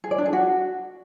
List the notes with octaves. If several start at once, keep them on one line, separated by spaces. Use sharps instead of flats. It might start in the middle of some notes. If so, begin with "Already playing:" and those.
G#4
D5
D4
G#4
F#4